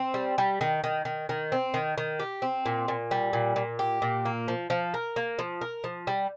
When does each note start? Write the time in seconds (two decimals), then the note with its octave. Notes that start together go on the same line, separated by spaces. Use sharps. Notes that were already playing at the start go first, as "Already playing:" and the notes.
Already playing: C4
0.14 G3
0.38 G3
0.61 D#3
0.84 D#3
1.05 D#3
1.29 D#3
1.52 C4
1.74 D#3
1.98 D#3
2.20 G4
2.42 C4
2.66 A#2
2.88 A#2
3.11 G3
3.33 A#2
3.56 A#2
3.79 G4
4.02 A#2
4.25 A#3
4.48 F3
4.70 F3
4.94 A#4
5.16 A#3
5.39 F3
5.61 A#4
5.84 F3
6.07 G3